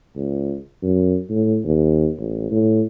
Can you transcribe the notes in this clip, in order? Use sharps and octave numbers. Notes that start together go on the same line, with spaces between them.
C#2
F#2
A2
D#2
A1
A2